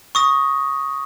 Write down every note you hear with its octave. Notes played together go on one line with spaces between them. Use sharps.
C#6 D#6 A#6